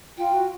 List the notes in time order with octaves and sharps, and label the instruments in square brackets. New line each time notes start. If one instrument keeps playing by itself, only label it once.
[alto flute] F4 [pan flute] G5
[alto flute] F#4